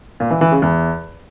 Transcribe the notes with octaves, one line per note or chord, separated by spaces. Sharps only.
A#2
E3
E3
C#3
E2